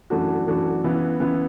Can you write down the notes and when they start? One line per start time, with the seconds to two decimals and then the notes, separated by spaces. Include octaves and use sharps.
0.10 F#2 E3 A3 D4 F#4
0.47 F#2 E3 A3 D4 F#4
0.84 C#3 E3 B3 E4 B4
1.20 C#3 E3 B3 E4 B4